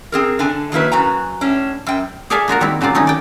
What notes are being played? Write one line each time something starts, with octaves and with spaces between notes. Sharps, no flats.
C4 G#4 A#4
D3 D4 G#5
D#3 F#3 A#3 E4 B4
F#2 F#4 B4 G#5 A#5
A2 C#4 D4
F#2 G5
G#4 A4 D5 E5 F5 G#5
A#3 F4 F#4 A#4
D#3 G3 C4 E4
C#3 F#3 C4 F4 D5
D#3 A3 C#4 D#4
D5 G5